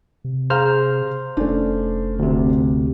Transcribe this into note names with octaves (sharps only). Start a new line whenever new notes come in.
C3
G#4 C5 F5 A#5 F6
F1 A3 C#4 D4
D2 C3